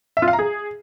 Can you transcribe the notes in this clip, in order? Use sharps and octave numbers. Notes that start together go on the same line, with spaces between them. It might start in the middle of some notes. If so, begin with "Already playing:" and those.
E5
F4
F5
A#5
G#4